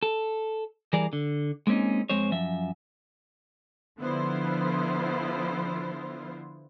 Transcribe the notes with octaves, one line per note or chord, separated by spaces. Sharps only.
A4
E3 G3 G#4 A#4 D5
D3
G#3 A#3 C4 C#4 D#4
F2 G#3 C4 C5 C#5
F#2 F3 E5
D3 F3 B3 E4 F4 C5